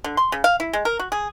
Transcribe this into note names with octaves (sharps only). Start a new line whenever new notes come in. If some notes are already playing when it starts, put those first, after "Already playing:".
D3
C6
C#3
F5
E4
G#3
A#4
F#4
G#4